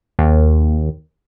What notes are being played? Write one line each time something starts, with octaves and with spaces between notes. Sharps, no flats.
D#2